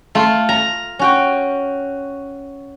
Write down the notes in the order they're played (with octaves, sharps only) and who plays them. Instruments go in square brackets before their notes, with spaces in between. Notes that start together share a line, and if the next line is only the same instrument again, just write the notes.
[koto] A3 F4
A#5
[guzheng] C#4 F#4 G5